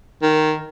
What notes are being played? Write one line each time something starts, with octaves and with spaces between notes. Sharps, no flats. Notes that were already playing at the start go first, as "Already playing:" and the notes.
D#3